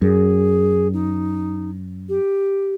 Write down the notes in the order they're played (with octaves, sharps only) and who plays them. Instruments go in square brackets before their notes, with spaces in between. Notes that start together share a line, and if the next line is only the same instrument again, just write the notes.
[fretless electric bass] F#2 [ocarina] G#4
[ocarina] D#4
G4